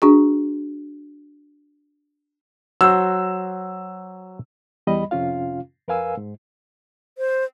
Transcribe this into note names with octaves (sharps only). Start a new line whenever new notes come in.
D4 F#4 G#4
F#3 F#4 C5 E6
E2 G3 D#5 B5
F2 C3 C#4 F4 F5
F2 A#4 B4 F5 G#5 E6
G#2
C5